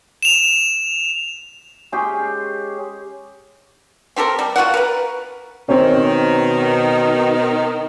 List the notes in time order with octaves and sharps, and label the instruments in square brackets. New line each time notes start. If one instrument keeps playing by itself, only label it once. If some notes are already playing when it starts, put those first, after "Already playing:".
[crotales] E7 F7
[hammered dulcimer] G#3 C#4 G4 G#4
[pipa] C4 G4 A4 A#4
G3
F4 F#4 A#4 F#5
A#4 B4
[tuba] B2 [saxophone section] D#3 [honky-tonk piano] C4 C#4